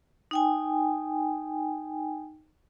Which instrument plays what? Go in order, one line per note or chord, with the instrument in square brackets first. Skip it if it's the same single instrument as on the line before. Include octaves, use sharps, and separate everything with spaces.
[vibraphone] D#4 G5 G#5